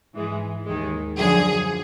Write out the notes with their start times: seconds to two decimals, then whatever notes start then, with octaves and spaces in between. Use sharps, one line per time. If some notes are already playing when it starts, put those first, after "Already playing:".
0.15 G#2 E3 G#3
0.66 D#2 D#3 G#3
1.17 F#2 D3 F3 G#4